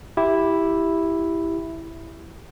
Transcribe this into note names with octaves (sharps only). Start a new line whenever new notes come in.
E4 G4